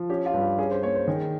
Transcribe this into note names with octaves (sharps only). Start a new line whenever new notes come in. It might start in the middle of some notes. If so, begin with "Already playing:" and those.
Already playing: F3
C#4 G4
F4
G2
G4
C#4 G#4
C5
A#3 C#5
C5
D#3 G#4